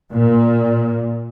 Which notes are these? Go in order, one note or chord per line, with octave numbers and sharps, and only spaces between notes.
A#2